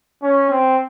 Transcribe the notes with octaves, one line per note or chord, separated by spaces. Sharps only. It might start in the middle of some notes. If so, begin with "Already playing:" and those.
C#4
C4